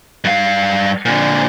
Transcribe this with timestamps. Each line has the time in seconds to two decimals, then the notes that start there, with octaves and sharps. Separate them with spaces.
0.24 G2 F5
1.05 A#2 D3